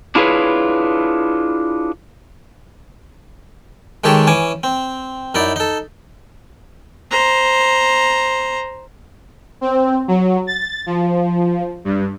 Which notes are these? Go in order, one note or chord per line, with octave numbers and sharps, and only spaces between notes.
D4 E4 F4 G#4 B4 C#5
D#3 G#3 G4 A4 C#5
E3 C#4 G#5 D6
C4
F#2 D#4 E4 D5
D#4 A4
C5 A#5
C4
F#3
A6
F3
G2